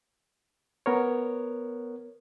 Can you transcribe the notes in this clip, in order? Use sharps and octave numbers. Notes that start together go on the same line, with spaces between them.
B3 A#4 C#5